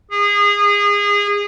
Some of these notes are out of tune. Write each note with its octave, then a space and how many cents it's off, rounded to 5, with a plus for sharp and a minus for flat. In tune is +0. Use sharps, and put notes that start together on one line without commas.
G#4 -25